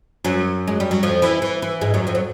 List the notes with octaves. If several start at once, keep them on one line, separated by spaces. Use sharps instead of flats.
F#2 F#3
G#3
G3
F#3
F2 F3
E3
E3
E3
G#2 G#3
F#2 F#3
F2 F3
F#3